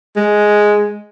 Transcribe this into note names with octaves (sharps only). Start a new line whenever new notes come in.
G#3